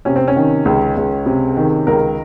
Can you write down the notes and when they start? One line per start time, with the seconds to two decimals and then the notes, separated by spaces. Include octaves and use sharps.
0.05 C3 C#4
0.16 C4
0.28 C#4
0.36 D#3
0.65 C#2
0.97 C#2
1.26 C3
1.57 D#3
1.87 C#2 A#4